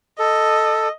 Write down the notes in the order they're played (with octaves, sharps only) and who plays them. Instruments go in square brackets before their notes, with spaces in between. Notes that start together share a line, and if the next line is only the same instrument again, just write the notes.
[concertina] A4 [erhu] D#5